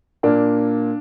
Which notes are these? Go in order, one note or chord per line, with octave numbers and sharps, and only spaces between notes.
A#2 A#3 D4